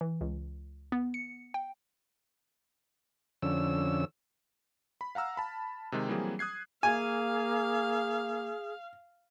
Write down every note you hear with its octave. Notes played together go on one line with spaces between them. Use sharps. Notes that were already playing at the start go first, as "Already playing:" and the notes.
E3
C#2
B3
C#7
G5
F2 D3 C#4 E6
B5
F5 F#5 A#5 E6 F6
A5 B5
C3 D#3 G#3
E3 F#3 G3 A#3 C4 G#4
D#6 F#6 G#6 C7
A#3 G#4 F5 G#5